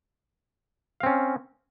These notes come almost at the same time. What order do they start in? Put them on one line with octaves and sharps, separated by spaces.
F5 C4 C#4